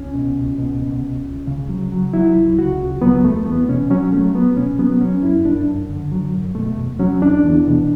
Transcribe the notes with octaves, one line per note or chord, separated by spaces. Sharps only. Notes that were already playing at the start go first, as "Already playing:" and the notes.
Already playing: C#2 C#4
B2
C#2
B2
B2
C#2
C#2
C#3
F#3
F#3
F#3 E4
C#2
C#3 F#4
C#2
F#3 B3
E2 A3
E2 B3
B2 C#4
F#3 C#4
F#3 A3
F#3 B3
B2 C#4
F#3 B3
F#3 C#4
F#2 E4
F#2 D4
F#2
D3
F#3
F#2
B2 A3
E2
F#3 C#4
E2 D4
E2
B2